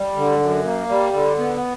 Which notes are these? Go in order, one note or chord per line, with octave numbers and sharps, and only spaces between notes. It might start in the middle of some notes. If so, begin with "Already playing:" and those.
Already playing: G3
D3
F#2
A#3
G3
D3
B3